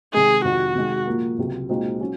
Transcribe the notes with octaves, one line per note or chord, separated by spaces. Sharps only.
C3 D#3 G#3 D#4 G#4
F2 C3 D#3 F#4
C3 D#3 G#3
A#2 F3 A#3
C#2 C3 F#3
A#2 G#3 C4 D#4 F#4
F#3 C#4